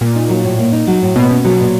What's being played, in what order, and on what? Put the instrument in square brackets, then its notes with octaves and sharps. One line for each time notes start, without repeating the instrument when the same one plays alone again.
[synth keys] A#2 [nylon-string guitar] A#3
[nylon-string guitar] D#4
F#3
A2
A#3
D#4
F#3
A2
[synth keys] B2 [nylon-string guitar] A#3
[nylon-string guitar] C#4
[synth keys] B2 [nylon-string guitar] F#3
[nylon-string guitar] A#2